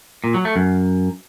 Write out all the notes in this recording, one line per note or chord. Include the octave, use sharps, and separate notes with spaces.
A#2
F#3
A3
F#2